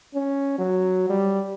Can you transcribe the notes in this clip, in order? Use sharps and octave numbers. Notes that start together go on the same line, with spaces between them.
C#4
F#3
G3